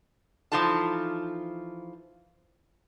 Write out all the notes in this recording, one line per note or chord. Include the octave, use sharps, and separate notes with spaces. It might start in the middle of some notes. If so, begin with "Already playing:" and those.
E3 F3 D#4 F4 A4 A5